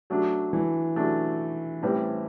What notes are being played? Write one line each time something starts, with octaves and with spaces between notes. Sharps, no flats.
F#3 A3 D4
E3
F#3 A3 D4
A2 E3 G3 C4